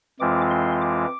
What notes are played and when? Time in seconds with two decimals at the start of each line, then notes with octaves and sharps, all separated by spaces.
0.20 F2 E3 G#3 C4 F4 D6
0.50 C6
0.81 D6